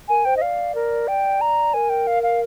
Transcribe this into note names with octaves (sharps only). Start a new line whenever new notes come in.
A#4 G#5
C5 G5
D#5
D5 F5
A#4
G5
A#5
A#4 G#5
G5
F5
F5